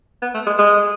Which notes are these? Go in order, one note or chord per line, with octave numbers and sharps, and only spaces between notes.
B3
A3
G#3
G#3